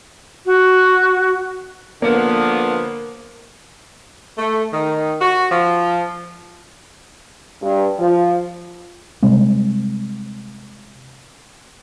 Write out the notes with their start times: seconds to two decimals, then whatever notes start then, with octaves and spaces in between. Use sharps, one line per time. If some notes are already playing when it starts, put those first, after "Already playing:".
0.46 F#4
2.02 D3 F3 A#3 B3
4.38 A3
4.72 D#3
5.20 F#4
5.51 F3
7.62 G2
7.99 F3
9.22 C3 G3 G#3 C4